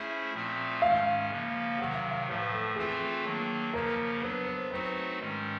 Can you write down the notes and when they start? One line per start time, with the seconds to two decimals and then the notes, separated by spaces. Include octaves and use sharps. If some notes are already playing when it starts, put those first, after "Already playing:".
Already playing: A3 C#4 E4 G#4 C5 E5
0.33 A#2 F3 A3 C4 F4
0.82 G#2 D#3 G#3 C#4 F5
1.31 C#3 F3 A#3
1.79 C3 D#3 F#3 F#5
1.95 F5
2.11 F5
2.28 A2 F3 A3 B4
2.52 A4
2.76 E3 A3 C4 F4 G#4
3.25 D#3 F#3 A#3 D4
3.74 C#3 F3 A#3 A#4
4.22 F#3 B3 D4 B4
4.46 C5
4.71 F#3 A3 C4 D#4 F#4 B4
5.19 G#2 D#3 G#3 C#4